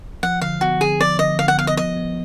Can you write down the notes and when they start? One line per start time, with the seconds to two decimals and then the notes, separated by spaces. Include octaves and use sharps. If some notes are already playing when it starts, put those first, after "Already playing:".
0.23 F3 F#5
0.41 D3 F5
0.61 B3 F#4
0.80 D3 G#4
1.00 F3 D5
1.19 D3 D#5
1.39 D3 F5
1.48 F#5
1.58 B3 F5
1.67 D#5
1.77 F3 D#5
1.97 B3